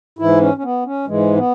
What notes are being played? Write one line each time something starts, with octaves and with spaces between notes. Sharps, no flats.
G#2 E3 E4
C#4
C#4
B3
C#4
G#2 E3 G#3
B3